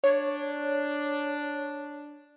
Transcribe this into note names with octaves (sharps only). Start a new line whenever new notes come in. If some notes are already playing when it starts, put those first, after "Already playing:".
D4 C#5